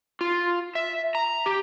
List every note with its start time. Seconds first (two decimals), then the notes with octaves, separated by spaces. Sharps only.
0.21 F4
0.75 E5
1.15 A#5
1.46 G4